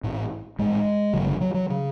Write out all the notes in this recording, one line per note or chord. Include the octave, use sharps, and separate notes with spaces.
A1 G#2
A1 G#2 G#3
G#1 F#2 C#3 F#3
D3
F#3
F#3
C#3